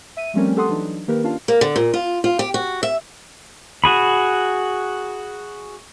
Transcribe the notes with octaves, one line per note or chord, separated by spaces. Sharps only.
E5 D#7
F3 G3 A3 C4 C#4 A#4
G4 A4 F#5 C6 D#6
E3 F#3 D4 D#4
D#3 A#3 G4 A#4 B4
C#4 D4 F4 F5 A5
A#3
D3
A#2
F4
F4
G4
F#4
E5
F#4 G#4 B5